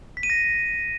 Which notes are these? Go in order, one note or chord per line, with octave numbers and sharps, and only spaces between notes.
B6
D#7
A#6